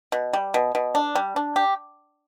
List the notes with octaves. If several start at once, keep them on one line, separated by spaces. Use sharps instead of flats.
B2
G3
B2
B2
D4
G3
D4
G4